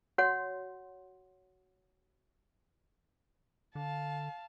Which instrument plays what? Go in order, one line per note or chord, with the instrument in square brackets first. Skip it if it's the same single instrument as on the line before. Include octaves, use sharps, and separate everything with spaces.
[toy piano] F#4 C#5 F#5 C6
[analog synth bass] D3 [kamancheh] F5 A5